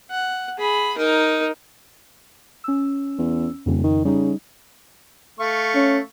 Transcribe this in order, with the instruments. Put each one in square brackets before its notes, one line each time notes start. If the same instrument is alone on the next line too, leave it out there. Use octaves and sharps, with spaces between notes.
[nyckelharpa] F#5
G#4 B5
D#4 A#4
[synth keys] C#4 E6
[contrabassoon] E2
[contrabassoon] D#1 [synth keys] F2 C#3
[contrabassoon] D#3
[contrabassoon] C#3 [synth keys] G3 D#4
[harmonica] A3 F5 C#6
[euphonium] C#4